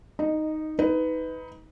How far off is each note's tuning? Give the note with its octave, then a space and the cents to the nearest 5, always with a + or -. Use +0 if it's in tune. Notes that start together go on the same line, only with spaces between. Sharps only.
D#4 +0 D#5 -15
D#4 +25 B4 +15